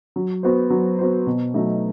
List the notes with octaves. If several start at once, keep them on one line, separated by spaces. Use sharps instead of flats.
F#3
B3 F#4 C5
F#3
B3 F#4 C5
B2
F#3 A3 D#4